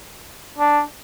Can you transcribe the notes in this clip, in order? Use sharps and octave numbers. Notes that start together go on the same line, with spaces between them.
D4